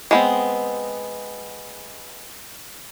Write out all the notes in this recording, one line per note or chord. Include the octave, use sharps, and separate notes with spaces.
G#3 B3 C4